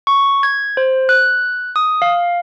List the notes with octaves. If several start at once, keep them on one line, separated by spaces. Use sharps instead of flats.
C#6
G#6
C5
F#6
D#6
F5